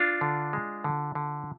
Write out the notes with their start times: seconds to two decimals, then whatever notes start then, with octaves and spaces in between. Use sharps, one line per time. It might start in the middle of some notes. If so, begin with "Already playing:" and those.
Already playing: D4 F4
0.21 D3
0.53 G#3
0.84 D3
1.15 D3